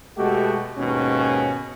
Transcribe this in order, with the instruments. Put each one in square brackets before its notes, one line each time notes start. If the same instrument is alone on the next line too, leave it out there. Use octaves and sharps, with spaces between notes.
[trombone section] B2 G#3 A3 F#4 G4
D#2 G#2 B2 C#4